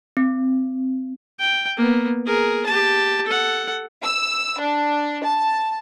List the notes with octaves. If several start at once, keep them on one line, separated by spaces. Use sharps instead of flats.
C4
G5
A#3 B3
G#4 A#4
G4 A5
A4 F#5
E6
D4
A5